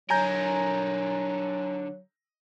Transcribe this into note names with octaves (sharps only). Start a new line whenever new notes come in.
D3 F#3 A#4 G#5 A#5 G6